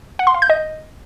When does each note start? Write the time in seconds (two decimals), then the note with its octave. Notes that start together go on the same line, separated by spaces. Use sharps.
0.19 F#5
0.27 C6
0.34 F5
0.42 G6
0.50 D#5